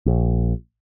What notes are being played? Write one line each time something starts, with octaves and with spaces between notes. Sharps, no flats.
A#1